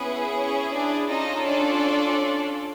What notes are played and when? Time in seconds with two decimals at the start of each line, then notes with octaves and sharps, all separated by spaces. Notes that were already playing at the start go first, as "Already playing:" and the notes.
Already playing: B3 C#4 E4 G#4 B4
0.35 C#4 C#5
0.71 D4 D5
1.08 C#4 D#4 F4 A4 D#5
1.45 D4 D5